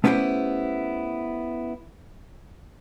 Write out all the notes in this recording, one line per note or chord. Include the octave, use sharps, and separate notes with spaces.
A3 B3 C#4 E4 G4 C5